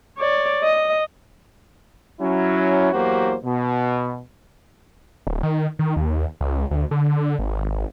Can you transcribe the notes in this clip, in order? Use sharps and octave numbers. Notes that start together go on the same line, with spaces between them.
C#5 D5
D#5
F#3 C#4 E4
E2 F#3 A#3 F#4 G4 C5
B2
D1
D#3
D#3
D#2
C#2
D2
D3
G#1